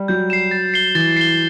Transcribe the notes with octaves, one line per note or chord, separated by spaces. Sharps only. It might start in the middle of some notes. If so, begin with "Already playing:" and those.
Already playing: G3
F#3 G6
C7 E7
A6
C7 G7
E3 A6
C7 G7